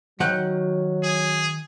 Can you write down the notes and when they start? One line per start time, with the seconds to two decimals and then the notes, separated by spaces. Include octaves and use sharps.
0.20 D#3 F#3 F#5 G5
1.03 G#4